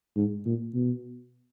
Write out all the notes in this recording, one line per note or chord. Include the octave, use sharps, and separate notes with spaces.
G#2
A#2
B2